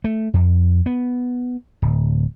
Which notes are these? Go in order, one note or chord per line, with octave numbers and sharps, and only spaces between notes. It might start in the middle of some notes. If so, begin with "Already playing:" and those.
A3
F2
B3
D1